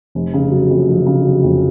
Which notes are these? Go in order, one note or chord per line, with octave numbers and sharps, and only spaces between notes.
F1
C#3
F#3
F2
F1
C#3
F#3
F2